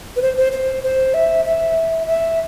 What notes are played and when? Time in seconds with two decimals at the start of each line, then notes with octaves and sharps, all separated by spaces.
0.16 B4
0.22 C5
0.37 C5
0.52 C5
0.83 C5
1.14 E5
1.45 E5
2.07 E5